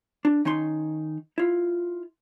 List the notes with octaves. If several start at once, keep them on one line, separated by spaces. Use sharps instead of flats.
D4
D#3 C#4 D#4 C6
E4 F4